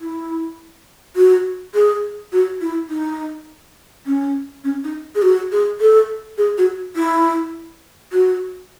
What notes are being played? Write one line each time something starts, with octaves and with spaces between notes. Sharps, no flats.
E4
F#4
G#4
F#4
E4
D#4
C#4
C#4
D#4
G#4
F#4
G#4
A4
G#4
F#4
E4
F#4